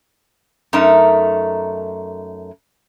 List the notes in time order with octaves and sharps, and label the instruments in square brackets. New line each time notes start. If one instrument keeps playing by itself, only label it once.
[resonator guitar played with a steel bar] F#2 A3 D#4 A#4 E5